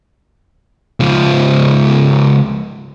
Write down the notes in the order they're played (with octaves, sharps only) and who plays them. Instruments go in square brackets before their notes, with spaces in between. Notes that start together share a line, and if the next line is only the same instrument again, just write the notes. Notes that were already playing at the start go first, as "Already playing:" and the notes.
[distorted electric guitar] C#2 F3